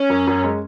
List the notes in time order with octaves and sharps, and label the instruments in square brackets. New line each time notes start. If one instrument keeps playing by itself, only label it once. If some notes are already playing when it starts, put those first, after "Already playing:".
Already playing: [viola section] C#4
[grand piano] F#2
F#2
G#3